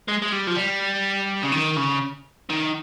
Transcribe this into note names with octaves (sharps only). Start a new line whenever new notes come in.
G#3
G#3
G3
F3
G3
C#3
D#3
C#3
D#3